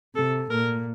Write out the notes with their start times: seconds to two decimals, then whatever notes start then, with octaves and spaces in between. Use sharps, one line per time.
0.15 C3 A4
0.50 A#2 A#4